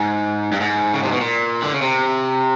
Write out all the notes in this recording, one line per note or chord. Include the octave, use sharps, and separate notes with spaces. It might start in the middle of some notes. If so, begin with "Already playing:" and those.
Already playing: G#2
G2
G#2
C#3
C3
B2
A#2
D3
C#3
C3